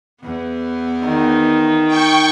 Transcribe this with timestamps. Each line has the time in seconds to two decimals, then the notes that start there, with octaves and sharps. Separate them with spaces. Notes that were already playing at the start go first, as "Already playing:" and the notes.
0.21 E2 B3
1.05 D#3
1.87 G5 C#6